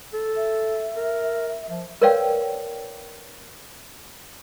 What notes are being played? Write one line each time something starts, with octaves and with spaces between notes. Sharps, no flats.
A4
E5
A#4
F3
A#4 B4 C#5 D5 F5 G5